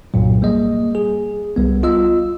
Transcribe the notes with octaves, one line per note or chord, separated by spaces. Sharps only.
C2 G2 A#2 F#3
G3 A#3 G#4 D#5
G#4
C2 G3 B3
F4 D#5 E6